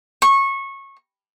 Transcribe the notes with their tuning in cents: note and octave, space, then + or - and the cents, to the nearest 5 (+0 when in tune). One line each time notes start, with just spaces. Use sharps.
C#6 -20